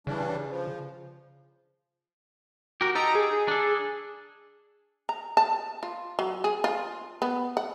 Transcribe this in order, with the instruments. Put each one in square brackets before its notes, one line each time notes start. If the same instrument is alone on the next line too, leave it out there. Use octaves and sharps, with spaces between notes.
[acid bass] C#3 [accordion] E3 G3 D4
[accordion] F3
[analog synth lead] F#4 [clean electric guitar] G4 A#4
[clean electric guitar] D#4 G4 A4 [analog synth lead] A#5
[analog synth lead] G#4
[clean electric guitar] D4 A4
[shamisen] A#5
A5
F4
F#3
G#4
F4
B3
F#5